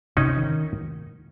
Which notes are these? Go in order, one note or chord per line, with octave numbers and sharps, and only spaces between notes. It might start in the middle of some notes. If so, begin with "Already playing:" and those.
C3 C#4 D#4
D#3